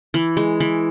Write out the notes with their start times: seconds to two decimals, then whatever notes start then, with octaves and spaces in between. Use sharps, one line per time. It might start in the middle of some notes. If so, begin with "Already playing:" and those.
0.14 E3
0.37 G#3
0.60 E3